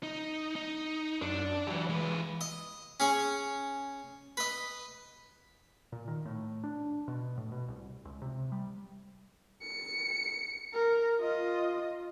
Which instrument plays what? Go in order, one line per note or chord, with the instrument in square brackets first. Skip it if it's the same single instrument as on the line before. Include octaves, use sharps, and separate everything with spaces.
[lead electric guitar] D#4
D#4
[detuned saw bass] F#2 [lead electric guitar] D4
[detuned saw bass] E3 [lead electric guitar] F#3 G4
[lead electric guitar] G#3 B4
[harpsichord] D#5
C#4 G#4 C#5
B4 D#5
[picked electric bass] A#2
D#3
A2
D4
B2
A2
B2
C2
C#2
C3
G3
[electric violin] C#7
A#4
F4 D#5